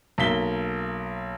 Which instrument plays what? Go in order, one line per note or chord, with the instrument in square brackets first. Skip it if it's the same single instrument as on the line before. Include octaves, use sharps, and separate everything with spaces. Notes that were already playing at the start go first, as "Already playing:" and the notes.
[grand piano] B1 A#3 B6 G7